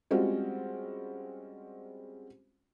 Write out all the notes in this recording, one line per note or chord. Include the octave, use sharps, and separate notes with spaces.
G3 G#3 C4 C#4 F4 F#4